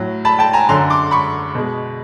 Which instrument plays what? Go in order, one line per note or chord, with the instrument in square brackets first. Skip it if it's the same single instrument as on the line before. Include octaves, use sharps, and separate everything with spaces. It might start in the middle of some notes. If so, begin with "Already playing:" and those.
Already playing: [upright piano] A2 F#3
A5 B5
G5 A5
G#5 A#5
F#2 D3 F#3 A#5 C6
C6 D6
B5 C#6
B2 G#3